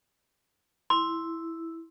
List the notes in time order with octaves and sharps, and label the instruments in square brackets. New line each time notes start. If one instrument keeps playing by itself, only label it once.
[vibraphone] E4 [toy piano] C6